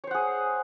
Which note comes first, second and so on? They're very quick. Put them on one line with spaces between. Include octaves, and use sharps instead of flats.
C#5 C5 F#5 G#4